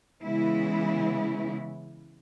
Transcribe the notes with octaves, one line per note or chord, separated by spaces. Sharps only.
C#3 E3 G#3 B3 E4